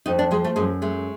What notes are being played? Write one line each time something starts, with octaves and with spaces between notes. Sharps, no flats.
F2 D#4
D4
F3 G#3
A3
F#2 G#3
G#3 A3